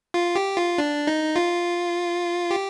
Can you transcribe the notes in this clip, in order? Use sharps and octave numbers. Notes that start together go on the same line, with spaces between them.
F4
G4
F4
D4
D#4
F4
G4